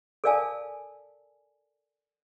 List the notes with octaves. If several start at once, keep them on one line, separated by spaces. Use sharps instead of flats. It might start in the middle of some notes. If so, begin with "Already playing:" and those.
A4 A#4 D5 F5 G#5 A5